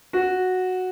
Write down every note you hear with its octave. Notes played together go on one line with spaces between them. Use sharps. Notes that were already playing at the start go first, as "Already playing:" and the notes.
F#4